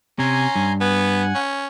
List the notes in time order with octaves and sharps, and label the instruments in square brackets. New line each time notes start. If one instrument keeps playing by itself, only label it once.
[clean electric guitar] C3 [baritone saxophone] C#4 [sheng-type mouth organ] G#5 A#5 C6
[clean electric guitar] G2
[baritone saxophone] B3 [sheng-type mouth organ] F#5 G#5
[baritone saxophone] C#4